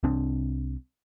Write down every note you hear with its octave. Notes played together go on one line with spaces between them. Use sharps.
C2 C3 C4 D4